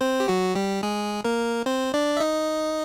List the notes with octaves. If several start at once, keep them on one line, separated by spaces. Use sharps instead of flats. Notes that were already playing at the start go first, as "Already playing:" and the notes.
C4 C5
G4
F#3 F#4
G3 G4
G#3 G#4
A#3 A#4
C4 C5
D4 D5
E5
D#4 D#5